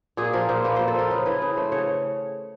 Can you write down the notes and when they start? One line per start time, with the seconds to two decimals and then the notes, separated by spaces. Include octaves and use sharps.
0.17 A#2 G#4
0.33 F3 A#4
0.49 A#2 C5
0.65 A#3 B4
0.76 A#2 C5
0.88 A4
0.95 F3 A#4
1.10 C#3 B4
1.26 E3 B4
1.41 C#3 B4
1.57 A3 C5
1.72 C#3 C#5